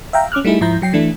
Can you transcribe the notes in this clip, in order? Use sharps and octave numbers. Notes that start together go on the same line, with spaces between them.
E5 F5 G5 A#5
C#4 D6 F6 F#6
G3 A3 D#4 E4 G#4
G#2 F3 E4 A#5 G6
F#3 G5 C7
E3 A3 D4 E4